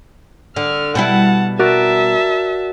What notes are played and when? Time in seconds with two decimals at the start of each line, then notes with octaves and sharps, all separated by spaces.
0.56 D3 F6
0.95 B2 G3 E4 F#5 A5
1.59 F#4 A#4 D5 E5 A5